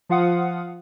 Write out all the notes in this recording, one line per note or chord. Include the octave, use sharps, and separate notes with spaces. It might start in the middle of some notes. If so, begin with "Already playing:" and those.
F3 F4 F5 F#5 D#6